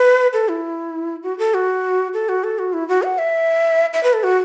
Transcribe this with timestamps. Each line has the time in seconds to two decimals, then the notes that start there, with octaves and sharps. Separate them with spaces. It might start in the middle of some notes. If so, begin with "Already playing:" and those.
Already playing: B4
0.33 A4
0.49 E4
1.23 F#4
1.39 A4
1.54 F#4
2.14 A4
2.29 F#4
2.44 A4
2.59 F#4
2.73 E4
2.88 F#4
3.03 F#5
3.18 E5
3.93 E5
4.03 B4
4.13 A4
4.23 F#4